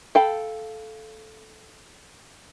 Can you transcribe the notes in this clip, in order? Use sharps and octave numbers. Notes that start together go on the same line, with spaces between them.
A4 F5 G5 B5